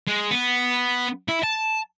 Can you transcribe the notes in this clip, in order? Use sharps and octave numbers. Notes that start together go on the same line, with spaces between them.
G#3
B3
E4
A5